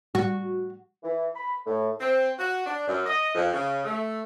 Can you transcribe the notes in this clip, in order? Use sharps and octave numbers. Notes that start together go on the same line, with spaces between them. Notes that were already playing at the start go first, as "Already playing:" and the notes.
F#4
E3
B5
A2
C4
F#4
D4
F#2
D#5
F2
C#3
A3